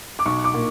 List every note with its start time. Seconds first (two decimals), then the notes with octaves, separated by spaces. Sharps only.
0.19 D6
0.26 B1 C#6
0.44 D6
0.54 A#2